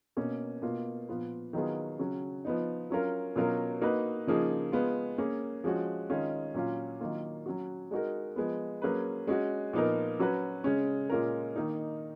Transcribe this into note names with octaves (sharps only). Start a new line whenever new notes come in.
B2 A#3 C#4
B2 A#3 F4
A#2 F3 B3 F4 B4
D#3 F#3 B3 F4 G#4
C#3 F#3 C#4 F#4
F3 B3 D#4
F#3 C#4 F4 A#4
B2 F#3 C#4 F4 A#4
A#3 D#4 F#4 B4
C#3 F3 A#3 D#4 G#4
G#3 B3 F4
A#3 C#4 G#4
F3 G#3 C#4 F#4
D#3 G#3 C#4 F4
A#2 F#3 C#4 F4
D#3 F#3 A#3 F4
F#3 C#4 F#4
G#3 D#4 F#4 A#4
F3 G#3 B3
F#3 A#3 C#4 G#4 B4
G#3 C#4 F#4
A#2 F3 B3 D#4 A#4
F#3 C#4 F#4 B4
C#3 G#3 C#4
A#2 G#3 C#4 F4 A#4
D#3 A#3 D#4